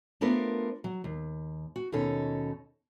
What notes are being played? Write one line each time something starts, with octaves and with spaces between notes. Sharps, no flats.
A3 B3 D4 F4 A#4 C5
F#3
D#2
F#4
D#2 B2 C#4 D#4 A4 C#5